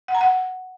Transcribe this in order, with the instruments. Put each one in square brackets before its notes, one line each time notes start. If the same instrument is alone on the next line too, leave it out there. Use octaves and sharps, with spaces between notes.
[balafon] F#5
A#5
F#5